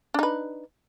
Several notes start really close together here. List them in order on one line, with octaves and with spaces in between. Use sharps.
D4 D#4 B4